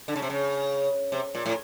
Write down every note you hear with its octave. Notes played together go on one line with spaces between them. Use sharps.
D3
C#3
C3
C#3
C3
A#2
A2